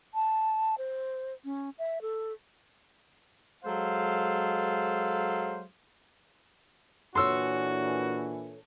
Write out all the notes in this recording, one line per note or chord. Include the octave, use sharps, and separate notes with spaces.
A5
C5
C#4
E5
A4
F#3 G#3 A4 C5 F5
A#2 E3 D4 F#4 A4 C#5 C6 E6